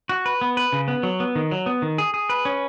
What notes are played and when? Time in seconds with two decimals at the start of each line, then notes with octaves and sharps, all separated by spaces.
0.09 F#4
0.26 B4
0.41 B3
0.57 B4
0.73 C#3
0.88 B3
1.03 F#3
1.20 B3
1.35 D#3
1.51 F#3
1.66 B3
1.82 D#3
1.98 G#4
2.14 G#4
2.29 B4
2.45 C#4